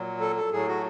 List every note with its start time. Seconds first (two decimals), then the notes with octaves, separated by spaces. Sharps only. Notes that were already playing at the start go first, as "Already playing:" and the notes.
Already playing: A#2 F#3
0.20 A4
0.36 A4
0.52 A2 F#3 G#4
0.68 F#4